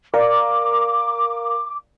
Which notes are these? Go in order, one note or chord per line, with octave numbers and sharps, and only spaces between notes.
A#4 D5 F5 A#5 D6